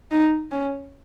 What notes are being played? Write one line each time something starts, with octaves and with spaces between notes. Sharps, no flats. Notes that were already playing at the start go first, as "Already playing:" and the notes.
D#4
C#4